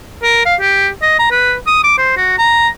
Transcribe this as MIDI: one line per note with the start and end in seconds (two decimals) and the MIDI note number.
0.23 0.43 70
0.46 0.55 77
0.60 0.88 67
1.02 1.19 75
1.19 1.27 82
1.31 1.54 71
1.67 1.81 87
1.84 1.96 86
1.98 2.12 72
2.17 2.36 66
2.38 2.68 82